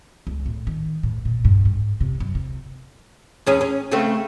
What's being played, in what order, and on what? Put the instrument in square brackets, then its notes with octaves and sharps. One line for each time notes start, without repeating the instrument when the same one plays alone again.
[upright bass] C#2
A2
D#3
A2
A#2
G2
G#2
C3
F#2
C3
[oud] E2 C#4 G#4
C#4
C#3 A3 C4